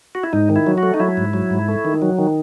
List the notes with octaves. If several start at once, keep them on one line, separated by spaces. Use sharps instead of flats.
F#4
E4
G#2 D#4
D#3
E4
F#3
F#4
A3
D#4
F#3 E4
G#2
F#3
G#2
A3
D#3
F#3
D#3